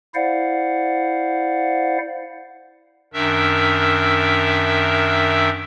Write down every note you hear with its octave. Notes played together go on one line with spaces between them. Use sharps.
E4 C5 D5 F5 F#5
F#2 D#3 D4 A#4 E5 E6